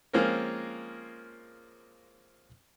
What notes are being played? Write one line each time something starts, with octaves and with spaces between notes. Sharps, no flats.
F3 G#3 A#3 C4 C#4 A#4